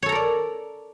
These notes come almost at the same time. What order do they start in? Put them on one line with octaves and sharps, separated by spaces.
C#5 A4 A#5 A#4 D5